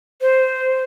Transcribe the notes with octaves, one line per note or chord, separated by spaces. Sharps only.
C5